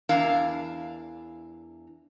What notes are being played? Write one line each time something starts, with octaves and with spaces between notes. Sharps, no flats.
E2 D4 E4 A#4 F5